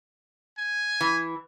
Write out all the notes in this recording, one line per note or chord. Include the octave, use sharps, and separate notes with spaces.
G#5
E3